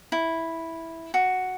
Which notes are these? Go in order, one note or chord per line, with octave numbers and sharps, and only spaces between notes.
E4
F#4